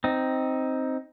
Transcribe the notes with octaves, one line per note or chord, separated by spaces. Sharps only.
C4 D#4